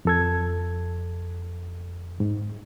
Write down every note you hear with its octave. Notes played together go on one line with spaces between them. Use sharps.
F2 A4 G#6
G#2